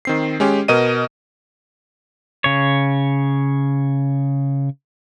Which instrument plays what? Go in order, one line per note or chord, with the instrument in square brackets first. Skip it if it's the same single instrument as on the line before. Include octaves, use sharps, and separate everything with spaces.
[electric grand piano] D#3 C4 C7
G#3 C#4 G4
B2 A#4 D#5 D#7
[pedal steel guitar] C#3 C#5